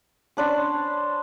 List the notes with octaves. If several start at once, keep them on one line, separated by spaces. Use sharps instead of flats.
C#4 D4 C5 B5